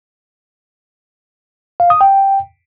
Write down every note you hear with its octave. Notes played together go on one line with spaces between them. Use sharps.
F5
D#6
G5